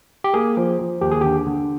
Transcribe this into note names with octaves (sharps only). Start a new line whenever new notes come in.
G4
A#3 G#4
F3
F3
D#2 G4
G#4
D3 G4
D3